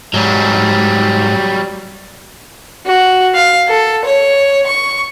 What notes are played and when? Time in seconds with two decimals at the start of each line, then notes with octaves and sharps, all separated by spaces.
0.14 G#2 F#3 G3
2.86 F#4
3.34 F5
3.68 A4
4.05 C#5
4.67 C#6